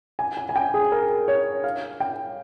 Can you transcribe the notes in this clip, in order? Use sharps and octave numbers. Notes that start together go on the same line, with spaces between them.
G#5
G#5
G#5
G5
G#4
A#4
C#5
F5
G5